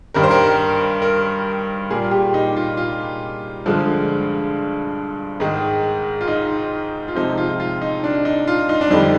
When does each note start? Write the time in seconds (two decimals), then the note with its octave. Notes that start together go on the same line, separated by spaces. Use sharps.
0.14 G2 D#3 G3 A#4
0.23 C5
0.31 A#4
1.02 A#4
1.90 A#2 G3 A#3 G#4
2.03 F4
2.11 G4
2.34 D#4
2.56 F4
2.77 F4
3.66 G2 D3 F3 G#3
5.40 G#2 D#3 G#3
6.21 F4
6.28 D#4
7.08 F4
7.15 C3 F3 G#3 D#4
7.38 F4
7.60 F4
7.82 D#4
8.04 D4
8.25 D#4
8.48 F4
8.69 D#4
8.81 D4
8.90 F2 D3 G3 D#4